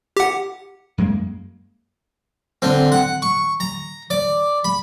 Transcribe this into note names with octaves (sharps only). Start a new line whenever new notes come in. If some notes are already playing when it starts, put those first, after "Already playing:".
G4 F#5
F#2 G#3 A#3
D3 C4
F#5
C#6
A#5
D5
B5